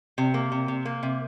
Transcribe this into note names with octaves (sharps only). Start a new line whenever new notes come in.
C3
A#3
C3
C3
A#3
C3